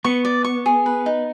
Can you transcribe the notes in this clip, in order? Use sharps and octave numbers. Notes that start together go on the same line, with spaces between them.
B3 C#6
D5
C#6
G#4
B4
D#4